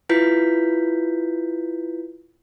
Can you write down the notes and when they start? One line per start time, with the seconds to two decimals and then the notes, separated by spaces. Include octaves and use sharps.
0.09 E4 F4 B4 G6 B6